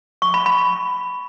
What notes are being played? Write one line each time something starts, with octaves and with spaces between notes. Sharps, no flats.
C#6
B5
B5